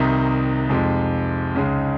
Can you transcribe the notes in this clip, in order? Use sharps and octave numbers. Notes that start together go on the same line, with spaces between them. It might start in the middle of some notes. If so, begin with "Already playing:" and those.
Already playing: C2 C3 D#3 D#4
F2 C3 F3 G#3
C#2 C#3 G#3